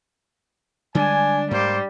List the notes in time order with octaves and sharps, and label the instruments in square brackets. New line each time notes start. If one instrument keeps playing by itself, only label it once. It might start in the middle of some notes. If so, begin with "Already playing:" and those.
[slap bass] D3 G3 G#3 [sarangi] D4 [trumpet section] G#5
[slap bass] G#2 [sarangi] G3 [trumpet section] A#3 C5 D6